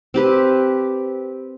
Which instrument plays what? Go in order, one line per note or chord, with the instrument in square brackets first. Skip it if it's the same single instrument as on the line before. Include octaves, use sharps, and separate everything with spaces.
[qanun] C4 G4 B4